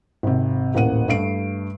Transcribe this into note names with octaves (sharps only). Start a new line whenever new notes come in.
G#1 C3
D#1 A1 A#3 F#5 D#7
G2 A3 C7 D7